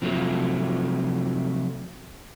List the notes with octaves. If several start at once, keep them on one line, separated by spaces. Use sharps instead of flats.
C3 F3 F#3 A3